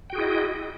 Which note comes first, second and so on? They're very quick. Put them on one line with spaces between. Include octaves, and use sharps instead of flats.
G5 F#4 G#4 E4 D#5